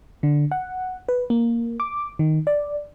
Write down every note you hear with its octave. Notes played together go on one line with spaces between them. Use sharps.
D3
F#5
B4
A#3
D6
D#3
D5